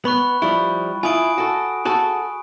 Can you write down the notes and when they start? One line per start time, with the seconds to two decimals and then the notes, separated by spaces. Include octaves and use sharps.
0.05 B3 B5 C#6 F#6
0.42 F3 G3 E4 C#6
1.03 E4 F4 G#5 D#6 D7
1.38 F#4 A4
1.85 F#4 G#4 A4